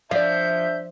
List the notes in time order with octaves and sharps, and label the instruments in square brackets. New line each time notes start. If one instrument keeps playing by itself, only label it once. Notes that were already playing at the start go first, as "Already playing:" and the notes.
[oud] F3 [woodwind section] D4 E5 [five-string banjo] D5 F5 [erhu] G6